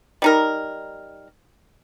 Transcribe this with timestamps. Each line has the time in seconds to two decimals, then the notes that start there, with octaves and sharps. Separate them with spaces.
0.22 G3 D#4 A#4